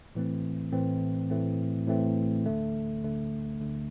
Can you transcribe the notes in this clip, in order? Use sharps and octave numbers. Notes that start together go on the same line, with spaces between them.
A2 E3 A3 C4
A2 E3 A3 C4
A2 E3 A3 C4
A2 E3 A3 C4
D2 D3 A3
D2 D3 A3
D2 D3 A3